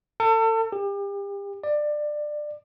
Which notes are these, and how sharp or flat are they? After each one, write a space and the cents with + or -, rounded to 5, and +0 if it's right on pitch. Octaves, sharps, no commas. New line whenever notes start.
A4 +35
G4 +35
D5 +20